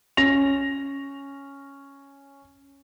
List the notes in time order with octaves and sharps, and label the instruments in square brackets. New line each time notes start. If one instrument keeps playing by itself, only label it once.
[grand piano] C#4 A#6 F7